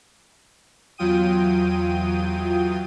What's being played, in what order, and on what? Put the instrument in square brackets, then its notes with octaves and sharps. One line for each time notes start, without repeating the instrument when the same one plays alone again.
[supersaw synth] E2 F#3 F4 G5 D#6 D#7